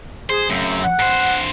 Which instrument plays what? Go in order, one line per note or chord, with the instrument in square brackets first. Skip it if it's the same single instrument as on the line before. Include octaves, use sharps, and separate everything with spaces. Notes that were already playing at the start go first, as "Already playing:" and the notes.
[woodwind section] G#4 [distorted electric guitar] C5
[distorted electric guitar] F#2 [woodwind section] C#3 A3 C4
[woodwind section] F#5
[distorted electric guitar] G2 C5